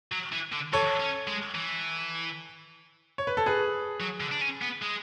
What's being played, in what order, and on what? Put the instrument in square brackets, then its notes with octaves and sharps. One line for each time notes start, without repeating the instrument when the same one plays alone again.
[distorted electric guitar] F#3
E3
D3
[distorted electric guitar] E3 [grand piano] A4 C#5
[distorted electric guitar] C#4
G#3
E3
[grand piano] C#5
B4
A4
G#4 B4
[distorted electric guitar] F#3
D3
D4
C#4
B3
G#3